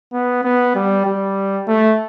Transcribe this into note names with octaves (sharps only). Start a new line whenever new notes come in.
B3
B3
G3
G3
A3